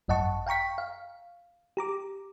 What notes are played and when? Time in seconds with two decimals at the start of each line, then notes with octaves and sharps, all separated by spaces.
0.08 G#1 F#2 D#5 F#5 A5 C#6
0.46 F5 G5 A#5 C#6 B6
0.78 F5
1.77 G4 A#5 D6